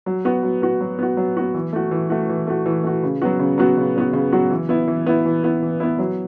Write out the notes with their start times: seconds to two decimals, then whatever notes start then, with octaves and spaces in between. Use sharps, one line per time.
0.06 F#3
0.25 B3 F#4
0.43 F#3
0.62 B3 F#4
0.81 F#3
0.99 B3 F#4
1.17 F#3
1.37 B3 F#4
1.54 E3
1.73 A3 F#4
1.91 E3
2.10 A3 F#4
2.29 E3
2.47 A3 F#4
2.66 E3
2.84 A3 F#4
3.03 C#3
3.22 F#3 B3 F#4
3.39 C#3
3.58 F#3 B3 F#4
3.77 C#3
3.96 F#3 B3 F#4
4.13 C#3
4.33 F#3 B3 F#4
4.50 E3
4.69 B3 E4
4.88 E3
5.06 B3 E4
5.25 E3
5.44 B3 E4
5.62 E3
5.80 B3 E4
5.99 F#3